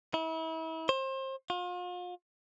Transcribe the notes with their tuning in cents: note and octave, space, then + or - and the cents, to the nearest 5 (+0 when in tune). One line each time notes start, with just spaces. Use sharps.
E4 -35
C5 +30
F4 +40